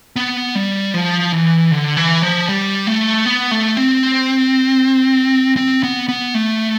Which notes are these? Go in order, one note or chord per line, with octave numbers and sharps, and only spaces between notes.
B3
G3
F3
E3
D3
E3
F3
G3
A3
B3
A3
C4
C4
B3
B3
A3